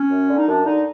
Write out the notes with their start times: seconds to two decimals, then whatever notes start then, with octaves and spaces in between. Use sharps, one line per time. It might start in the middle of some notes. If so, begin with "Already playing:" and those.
Already playing: C#4
0.10 F#2
0.28 D3
0.36 D#4
0.47 F#2 D4
0.65 D3 D#4